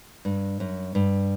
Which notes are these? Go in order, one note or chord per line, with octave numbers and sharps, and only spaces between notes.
G2
F#2
G2